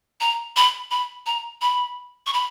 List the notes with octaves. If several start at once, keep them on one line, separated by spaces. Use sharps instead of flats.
A#5
B5
B5
A#5
B5
C#6
B5